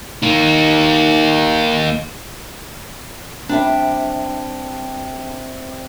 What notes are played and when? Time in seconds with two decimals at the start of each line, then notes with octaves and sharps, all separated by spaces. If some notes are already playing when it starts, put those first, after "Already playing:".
0.23 A#3 D#4
3.49 C3 G3 D4 E5